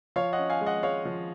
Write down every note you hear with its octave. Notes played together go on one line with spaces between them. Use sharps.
F3 C#5 F5
D#5 F#5
C#4
F5 G#5
G#3
D#5 F#5
G#3 C#5 F5
F3